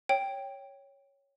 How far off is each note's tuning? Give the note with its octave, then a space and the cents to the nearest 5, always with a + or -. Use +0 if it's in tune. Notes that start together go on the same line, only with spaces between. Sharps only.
C#5 +0 G5 +0